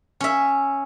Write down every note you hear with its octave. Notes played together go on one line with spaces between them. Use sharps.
C#4 E5